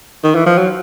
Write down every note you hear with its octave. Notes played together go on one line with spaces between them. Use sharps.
D#3
E3
F3
F#3